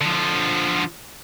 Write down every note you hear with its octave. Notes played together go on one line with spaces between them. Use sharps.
D3 F3